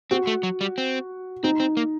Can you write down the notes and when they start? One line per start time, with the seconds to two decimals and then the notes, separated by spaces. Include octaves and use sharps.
0.11 C4 F#4
0.27 A3
0.43 F#3
0.61 G3
0.78 C4
1.43 C4 D#4
1.60 C4
1.77 A#3